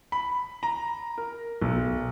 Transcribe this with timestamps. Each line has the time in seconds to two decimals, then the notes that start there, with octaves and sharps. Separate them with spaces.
0.12 B5
0.63 A#5
1.18 A#4
1.62 B1